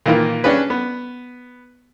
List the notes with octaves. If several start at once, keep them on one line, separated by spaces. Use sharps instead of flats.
A#2 D#3 E3 A#3 F4
C#4 D4 G4 G#4 B4
B3